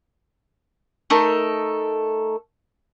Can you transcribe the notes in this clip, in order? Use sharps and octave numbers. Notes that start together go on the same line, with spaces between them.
A3 D#4 A4 A#4